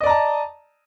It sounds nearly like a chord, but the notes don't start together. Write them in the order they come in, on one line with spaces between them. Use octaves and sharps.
D#5 D5 A#5 A5